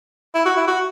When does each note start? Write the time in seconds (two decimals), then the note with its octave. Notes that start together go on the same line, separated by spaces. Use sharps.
0.34 E4
0.45 F#4
0.56 E4
0.67 F#4